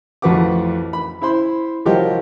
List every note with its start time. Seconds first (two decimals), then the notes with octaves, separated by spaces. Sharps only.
0.22 A1 F2 F#4 B4 F#5 D6
0.93 B5
1.22 E4 C5 B5 C6
1.85 C2 F3 F#3 G4 A#4 D#5